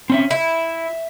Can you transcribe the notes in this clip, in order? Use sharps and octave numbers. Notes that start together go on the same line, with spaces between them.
C4 C#4 E5
E4 E5